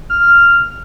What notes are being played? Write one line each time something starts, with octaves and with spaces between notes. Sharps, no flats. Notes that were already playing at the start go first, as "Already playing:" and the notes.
F6